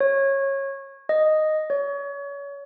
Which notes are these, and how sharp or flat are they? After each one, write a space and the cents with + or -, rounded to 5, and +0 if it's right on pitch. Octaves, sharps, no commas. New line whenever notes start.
C#5 -20
D#5 -5
C#5 +30